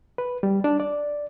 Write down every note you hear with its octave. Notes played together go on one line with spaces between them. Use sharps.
B4
G3
D4
D5